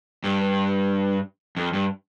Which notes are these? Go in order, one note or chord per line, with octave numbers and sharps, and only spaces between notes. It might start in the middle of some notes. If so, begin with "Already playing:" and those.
G2
F2
G2